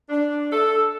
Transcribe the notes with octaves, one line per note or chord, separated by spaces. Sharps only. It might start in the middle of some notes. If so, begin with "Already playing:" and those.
D4
A4